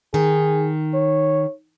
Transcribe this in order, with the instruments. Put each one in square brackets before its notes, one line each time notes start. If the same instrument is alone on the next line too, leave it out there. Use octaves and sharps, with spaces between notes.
[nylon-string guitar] D#3 [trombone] G#4
[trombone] C#5